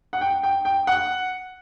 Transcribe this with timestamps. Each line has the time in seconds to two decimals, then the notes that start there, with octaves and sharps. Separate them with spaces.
0.13 F#5
0.21 G5
0.43 G5
0.65 G5
0.87 F#5